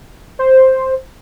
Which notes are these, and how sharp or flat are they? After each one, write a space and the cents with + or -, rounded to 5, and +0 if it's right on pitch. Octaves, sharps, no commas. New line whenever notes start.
C5 +5